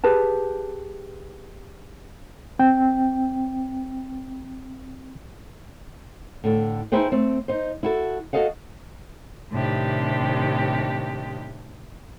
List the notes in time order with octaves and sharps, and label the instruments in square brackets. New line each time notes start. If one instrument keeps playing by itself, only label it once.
[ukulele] G4 G#4 B4 A5
[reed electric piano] C4 G5
[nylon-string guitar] A2 D3 A4
D#4 E4 G#4 B4 C5 G5
A3 C4
D#4 C5
E4 F#4 A4
F#4 G4 A4 D#5 F5 F#5
[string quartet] A2 C3 D#3 D4 G4